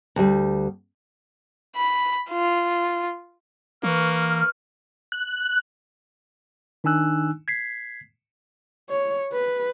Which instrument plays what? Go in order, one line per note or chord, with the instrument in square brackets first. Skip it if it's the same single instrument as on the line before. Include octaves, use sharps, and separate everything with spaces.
[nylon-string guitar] D2 G3
[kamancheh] B5
F4
[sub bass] E3 [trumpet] A#3 [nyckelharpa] B4 C#6 [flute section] F6
[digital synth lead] F#6
[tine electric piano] D#3 D4 D#4 G#5 E6 F#6
G#6 B6 C7
[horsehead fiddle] C#5
B4